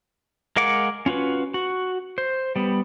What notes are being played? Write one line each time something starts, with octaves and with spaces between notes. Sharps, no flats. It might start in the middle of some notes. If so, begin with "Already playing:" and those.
G#3 A#4 F5 F#5 D6
C#4 F4 F#4 B4
F#4
C5
G3 B3